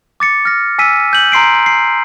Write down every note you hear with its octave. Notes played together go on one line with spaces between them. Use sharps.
D6 A6 C#7
F6 A#6
G#5 E6 B6 D#7
G6 F#7
A#5 C6 C7 D7
C7